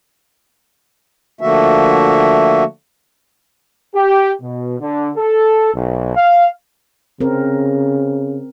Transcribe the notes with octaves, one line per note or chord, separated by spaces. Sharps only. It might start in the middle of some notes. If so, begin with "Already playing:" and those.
D3 F3 A3 A#3 F#4 E5
G4
B2
D3
A4
B1
F5
C#3 C4 A#4